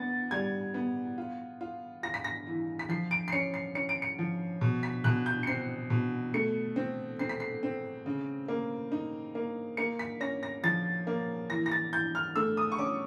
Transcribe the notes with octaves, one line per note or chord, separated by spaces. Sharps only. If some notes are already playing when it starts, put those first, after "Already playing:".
Already playing: B3 A6
G3 G#6
B3
F4
F4
F4 A#6
B6
A#6
E3
B6
F3 C7
D7
C7
C#4 C#7
C7
C#4 C#7
D7
C#7
F3
B2
B6
B2 F#6
G6
C#7
C4 C7
B2
A3 C#7
C4
C4 C7
B6
C7
C4
C#3
A#3
D#4
A#3
A#3 C#7
B6
C#4 A#6
A#6
F3 A6
A#3
E3 A#6
A#6
A6
E3 G6
F6
A3 E6
D#6
C#6
C#4 D6